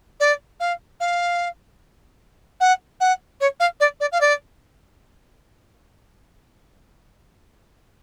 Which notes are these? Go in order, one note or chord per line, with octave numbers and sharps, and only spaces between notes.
D5
F5
F5
F#5
F#5
C#5
F5
D5
D5
F5
D5